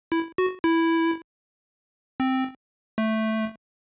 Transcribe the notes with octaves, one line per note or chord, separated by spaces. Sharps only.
E4
F#4
E4
C4
A3